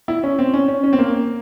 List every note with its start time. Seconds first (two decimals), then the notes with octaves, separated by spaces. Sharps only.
0.08 E4
0.23 C#4
0.39 C4
0.54 C#4
0.68 C#4
0.84 C#4
0.93 C4
0.99 A#3